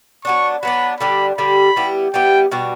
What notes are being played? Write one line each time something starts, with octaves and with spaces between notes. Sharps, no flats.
F#3 B3 D4 C#6
F#3 B3 D4 B5
D3 G3 D4 G4 B5
D3 G3 D4 G4 B5
G3 B3 E4 G4
G3 B3 E4 G4 G5
B2 G3 D4 F#4